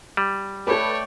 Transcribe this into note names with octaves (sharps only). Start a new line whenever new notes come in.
G3
A3 A4 B4 C#5 D5 G5